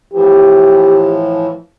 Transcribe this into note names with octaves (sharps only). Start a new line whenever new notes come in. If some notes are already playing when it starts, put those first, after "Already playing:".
A2 E3 F3 G4